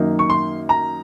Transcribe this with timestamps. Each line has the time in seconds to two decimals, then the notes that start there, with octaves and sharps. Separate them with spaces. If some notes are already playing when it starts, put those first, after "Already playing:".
Already playing: F#2 D#3 A#3 D#4
0.19 C#6
0.30 C6
0.69 A#5